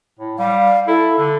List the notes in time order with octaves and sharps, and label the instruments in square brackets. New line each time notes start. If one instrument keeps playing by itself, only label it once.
[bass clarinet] A2
[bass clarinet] G3 [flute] F5
[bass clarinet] E4 [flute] A4
[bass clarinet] D3